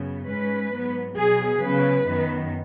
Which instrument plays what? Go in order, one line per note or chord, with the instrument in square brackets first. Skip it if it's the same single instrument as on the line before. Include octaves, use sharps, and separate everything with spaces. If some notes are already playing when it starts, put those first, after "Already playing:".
Already playing: [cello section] F#2 C#3 B3
G#2 G#3 C#4 B4
G#2 F#3 B3
B2 F#3 B3 G#4
C#3 F#3 B3 B4
F#2 D#3 B3